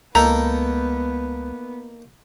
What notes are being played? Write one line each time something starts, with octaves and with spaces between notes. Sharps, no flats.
C#2 A#3 B3 D#4 A4 A#5